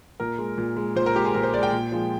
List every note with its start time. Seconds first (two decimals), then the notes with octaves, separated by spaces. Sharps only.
0.20 A#2 A#4
0.38 G#3
0.58 A#2
0.77 G#3
0.96 A#2 C5
1.06 A#4
1.15 G#3 G4
1.25 G#4
1.34 A#2 A#4
1.43 C5
1.53 G#3 D5
1.63 G5
1.72 A#2
1.92 F3 G#3